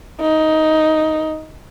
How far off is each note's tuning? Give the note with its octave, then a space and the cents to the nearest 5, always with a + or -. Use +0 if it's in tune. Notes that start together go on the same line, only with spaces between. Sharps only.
D#4 +10